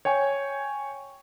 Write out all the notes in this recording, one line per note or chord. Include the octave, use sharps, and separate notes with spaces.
C#5 G5 G#5 C#6